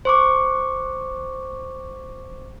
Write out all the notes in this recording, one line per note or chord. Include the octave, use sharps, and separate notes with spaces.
C5 C#6 D6